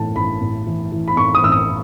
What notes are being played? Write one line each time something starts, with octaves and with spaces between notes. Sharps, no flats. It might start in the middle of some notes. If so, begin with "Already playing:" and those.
Already playing: A2 E3 A5
A1 B5
A2
E3
E3
B5
A2 C#6
D#6
A1 E6
D#6